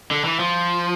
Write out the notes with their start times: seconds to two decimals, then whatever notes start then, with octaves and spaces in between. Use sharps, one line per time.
0.11 D3
0.25 E3
0.40 F3